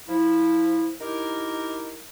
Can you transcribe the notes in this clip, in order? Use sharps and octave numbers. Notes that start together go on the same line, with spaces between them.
F3 E4
D#4 E4 G4 A#4